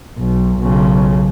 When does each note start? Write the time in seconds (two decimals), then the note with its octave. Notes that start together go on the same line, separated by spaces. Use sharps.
0.19 B1
0.59 B1 C#3